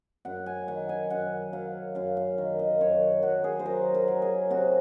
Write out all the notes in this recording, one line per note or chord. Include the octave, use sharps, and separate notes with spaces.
F#2 F#5
G#5
D#3 F#5
G#5
F#2 F#5
F#3 F5
F#2 F5
F5
D#3
D#5
F#2 C#5
F#3 F#4
G#4
C5
F#3 A#4
A#4
F#3
G#4
C3 F#4